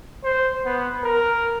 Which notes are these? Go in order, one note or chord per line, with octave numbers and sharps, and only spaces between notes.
C5
B3
A#4